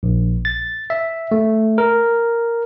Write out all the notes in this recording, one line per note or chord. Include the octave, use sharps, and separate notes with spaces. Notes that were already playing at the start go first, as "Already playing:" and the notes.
A#1
A6
E5
A3
A#4